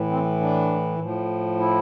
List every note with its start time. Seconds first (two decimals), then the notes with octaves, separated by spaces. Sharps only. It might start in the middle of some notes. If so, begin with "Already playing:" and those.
Already playing: A2 E3
0.10 C4
0.40 D4
0.99 A2 F3
1.59 E4